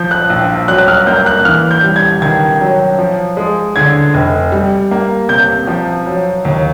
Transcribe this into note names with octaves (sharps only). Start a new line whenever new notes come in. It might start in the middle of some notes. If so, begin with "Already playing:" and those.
Already playing: F3 G6
F#6
A#1
F#3 F#6
F#6
F6
A#3 G6
F#6
E3 F6
G6
G3
G#6
D#3 G#6
F#3
F3
G#3
D3 G#6
F1
G3
A#3
C3 G6
F3
F#3
D#2